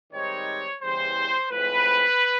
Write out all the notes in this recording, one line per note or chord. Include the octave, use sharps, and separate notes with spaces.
G#2 D#3 G3 C4 D#4 C#5
E2 C#3 E3 G3 C5
A2 F3 G#3 C4 B4